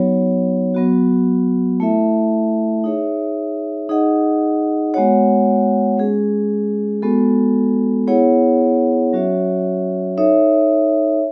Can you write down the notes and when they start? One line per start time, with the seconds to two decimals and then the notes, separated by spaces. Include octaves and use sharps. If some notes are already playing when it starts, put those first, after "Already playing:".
Already playing: F#3 B3 D#4 F#4 C#5
0.74 F#3 B3 F#4
1.80 A3 E4 A4 E5
2.84 D#4 G#4 C#5 E5
3.89 D#4 G#4 D#5 F#5
4.94 G#3 B3 F#4 C#5 F#5
5.98 G#3 C#4 G#4
7.02 G#3 B3 F#4 A4
8.07 B3 E4 G#4 C#5 F#5
9.13 F#3 C#4 F#4 C#5 E5
10.17 D#4 A4 C#5 E5